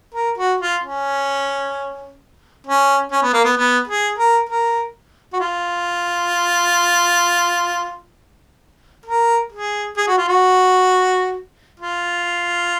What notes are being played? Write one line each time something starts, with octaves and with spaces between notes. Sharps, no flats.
A#4
F#4
F4
C#4
C#4
C#4
B3
A#3
B3
B3
G#4
A#4
A#4
F#4
F4
A#4
G#4
G#4
F#4
F4
F#4
F4